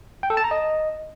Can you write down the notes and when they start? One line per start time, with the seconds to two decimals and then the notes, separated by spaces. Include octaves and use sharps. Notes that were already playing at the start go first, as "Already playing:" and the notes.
0.23 G5
0.30 A4
0.37 A5
0.44 A#5
0.51 D#5